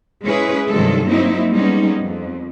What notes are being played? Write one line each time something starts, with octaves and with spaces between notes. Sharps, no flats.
G#3 C#4 E4 G#4 B4
G2 C3 D#3 F#3 G#3 A4
F#3 A#3 C4 D#4 E4
G3 G#3 A#3 B3 C#4 D#4
F2